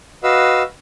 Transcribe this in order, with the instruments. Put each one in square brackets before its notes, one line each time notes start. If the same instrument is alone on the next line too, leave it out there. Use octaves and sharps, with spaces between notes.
[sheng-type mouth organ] F#4 B4 D#5 F5 E6